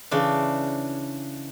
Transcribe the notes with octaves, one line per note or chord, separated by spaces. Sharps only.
C#3 E3 D4